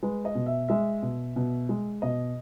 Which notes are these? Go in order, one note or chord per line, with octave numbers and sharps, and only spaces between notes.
G#3 B4
D#5
B2
E5
G#3 E5
B2
B2
G#3
B2 D#5